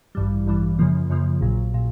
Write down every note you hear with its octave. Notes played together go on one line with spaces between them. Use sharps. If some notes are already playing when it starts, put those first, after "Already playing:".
A1 G2 E3 G3
A1 G2 E3 G3
F#2 C#3 F3 A#3
F#2 C#3 F3 A#3
A#1 A#2 F#3
A#2